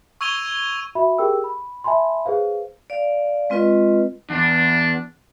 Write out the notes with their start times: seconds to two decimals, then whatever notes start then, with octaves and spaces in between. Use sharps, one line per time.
0.21 C#6 E6 G#6 D#7 F7 G7
0.95 F#4 E5 B5
1.19 G4 G#4 A#4 G5 E6
1.44 B5
1.84 E5 G#5 A5 B5 C6
2.26 G#4 B4 C5 F5
2.90 D5 F5
3.50 G#3 C4 F4 B4 D#5
4.30 E2 D4